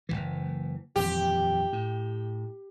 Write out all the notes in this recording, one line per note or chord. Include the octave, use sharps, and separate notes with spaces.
F#1 C2 E3
D#1 F2 E3 G4
A2